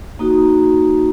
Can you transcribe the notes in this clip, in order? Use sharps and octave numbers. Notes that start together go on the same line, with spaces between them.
A#3 D#4 F#4